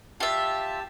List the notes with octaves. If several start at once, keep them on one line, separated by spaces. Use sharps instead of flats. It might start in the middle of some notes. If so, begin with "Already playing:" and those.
F4 G4 E5 A5